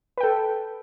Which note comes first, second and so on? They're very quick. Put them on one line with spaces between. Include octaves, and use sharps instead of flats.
B4 G5 A4